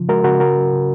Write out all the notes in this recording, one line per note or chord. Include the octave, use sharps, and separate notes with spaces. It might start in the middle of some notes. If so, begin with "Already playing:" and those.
Already playing: C#3 F3
G#3 F#4 A#4
C#3 F#4 A#4
C#3 F#4 A#4
F#3
C#3